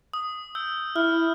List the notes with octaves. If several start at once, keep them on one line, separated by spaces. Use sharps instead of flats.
D#6
E6 G6
E4 F6